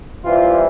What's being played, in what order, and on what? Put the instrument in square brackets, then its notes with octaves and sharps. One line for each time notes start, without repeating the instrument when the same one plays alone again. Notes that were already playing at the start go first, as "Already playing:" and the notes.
[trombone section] C3 E3 G3 F4